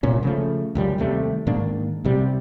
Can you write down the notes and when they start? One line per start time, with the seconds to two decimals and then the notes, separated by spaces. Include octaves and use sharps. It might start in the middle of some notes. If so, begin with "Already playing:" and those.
0.03 C2 A#2 C#4
0.23 C#3 F3 A3
0.75 C#2 F#2 G3
0.98 D#2 C3 G3 A3
1.47 G#2 D#3 A#3 D4
2.05 C2 C3 G3